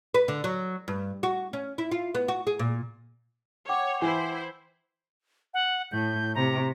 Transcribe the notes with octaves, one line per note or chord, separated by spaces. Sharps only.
B4
D3
F#3
G2
F#4
C#4
E4
F4
B3
F#4
G#4
A#2
C#5 F#5 G5 D6
E3 E4 C5
F#5
A2 G6
C3 A#5